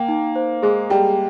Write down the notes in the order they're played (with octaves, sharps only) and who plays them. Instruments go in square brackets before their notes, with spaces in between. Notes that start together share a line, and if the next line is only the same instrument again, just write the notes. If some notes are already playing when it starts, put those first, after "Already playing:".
Already playing: [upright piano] A#3 [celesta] G5
[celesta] D#4
C5
[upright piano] G#3 [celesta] G#4
[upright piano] G3 [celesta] G5